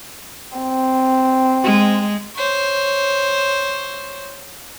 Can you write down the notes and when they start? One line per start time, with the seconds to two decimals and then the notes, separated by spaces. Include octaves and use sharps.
0.57 C4
1.64 G#3
2.35 C5 C#5